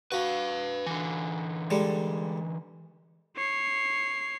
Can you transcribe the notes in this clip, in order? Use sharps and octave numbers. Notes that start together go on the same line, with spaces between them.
F#4 B4 F5
D3 E3
G3 G#3 A4
C#5 C7